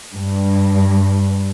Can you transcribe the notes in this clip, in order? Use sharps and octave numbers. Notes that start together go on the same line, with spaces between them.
G2